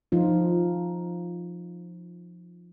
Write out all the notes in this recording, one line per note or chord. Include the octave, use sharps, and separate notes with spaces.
F3 D#4 F4